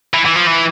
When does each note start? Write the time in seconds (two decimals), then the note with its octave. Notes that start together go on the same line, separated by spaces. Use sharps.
0.14 E3
0.25 E3
0.36 F3
0.46 E3